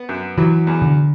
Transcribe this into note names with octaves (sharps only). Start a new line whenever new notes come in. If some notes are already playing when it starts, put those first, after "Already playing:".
Already playing: B3
F#2
E3 F#3
E2
D3